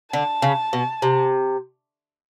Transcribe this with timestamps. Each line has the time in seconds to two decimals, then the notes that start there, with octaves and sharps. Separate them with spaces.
0.12 D3 A5
0.42 C#3
0.73 B2
1.02 C3